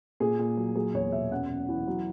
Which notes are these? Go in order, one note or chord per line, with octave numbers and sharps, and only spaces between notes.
A#2 G#4
A#2
F#3
F#3 G#4
E2 C#5
B2 E5
F#2 F#5
F#2
E3
F#3